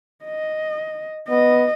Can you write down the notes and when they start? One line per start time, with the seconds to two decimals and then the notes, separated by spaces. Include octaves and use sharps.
0.25 D#5
1.29 B3 D#5